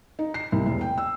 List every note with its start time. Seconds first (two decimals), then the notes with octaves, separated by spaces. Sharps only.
0.19 D#4
0.34 C7
0.52 C2
0.66 E1
0.81 G5
0.98 E6